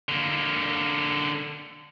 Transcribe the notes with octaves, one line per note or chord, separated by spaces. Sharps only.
D3 A#3